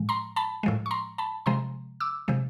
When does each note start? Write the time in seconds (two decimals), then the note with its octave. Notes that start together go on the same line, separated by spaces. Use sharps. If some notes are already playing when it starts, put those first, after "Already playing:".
Already playing: A2 F3 G#3
0.09 A#5 C6
0.36 A5 B5
0.63 A2 F3 G#3
0.86 C#6
0.91 A#5 C6
1.18 A5 B5
1.46 C3 F3 G#3 A#5 C6
2.00 D6 E6
2.28 C3 F3 G#3